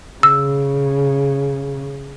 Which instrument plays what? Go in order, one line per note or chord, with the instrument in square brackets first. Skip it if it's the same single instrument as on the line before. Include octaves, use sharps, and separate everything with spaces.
[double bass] C#3 [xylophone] E6